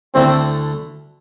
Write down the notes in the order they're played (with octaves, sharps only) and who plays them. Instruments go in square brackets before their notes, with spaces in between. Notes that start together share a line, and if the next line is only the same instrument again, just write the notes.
[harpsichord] D2 D3 A3 E4 A4 [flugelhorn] C4